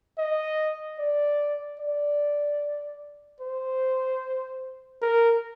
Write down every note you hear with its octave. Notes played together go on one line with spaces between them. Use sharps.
D#5
D5
D5
C5
A#4